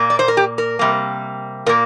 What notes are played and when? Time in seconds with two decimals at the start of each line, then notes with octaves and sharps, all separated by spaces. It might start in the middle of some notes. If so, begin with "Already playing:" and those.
Already playing: A#2 A#3
0.10 D5
0.19 C5
0.28 A#4
0.37 G4
0.58 A#4
0.79 C3 G3 A#3
1.66 A#2 A#3 A#4